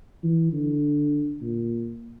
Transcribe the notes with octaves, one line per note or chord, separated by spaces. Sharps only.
E3
D3
A#2